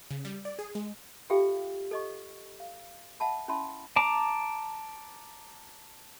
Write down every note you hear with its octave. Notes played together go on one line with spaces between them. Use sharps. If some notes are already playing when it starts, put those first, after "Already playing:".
C#3
G3
D5
G#4
G#3
F4 G4 A4 E5 F5 G5
A4 D#5 C#6
F5
E5 F#5 A5 B5
C#4 E4 E5 A5 B5 C6
A5 A#5 D6